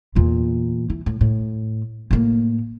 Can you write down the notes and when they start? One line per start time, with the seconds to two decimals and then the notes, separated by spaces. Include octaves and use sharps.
0.15 E2 A#2
0.90 E3
1.06 A2
1.21 A2
2.11 A2 A#3